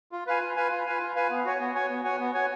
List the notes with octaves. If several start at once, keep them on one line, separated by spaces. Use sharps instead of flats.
F4
B4 F5 G#5
F4
B4 F5 G#5
F4
B4 F5 G#5
F4
B4 F5 G#5
B3
F#4 C#5 G#5
B3
F#4 C#5 G#5
B3
F#4 C#5 G#5
B3
F#4 C#5 G#5